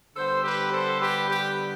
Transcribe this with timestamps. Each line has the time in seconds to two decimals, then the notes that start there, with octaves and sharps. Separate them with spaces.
0.15 D3 G3 B3 A4 C5
0.43 G4 B4
0.72 A4 C5
1.00 G4 B4
1.28 G4 B4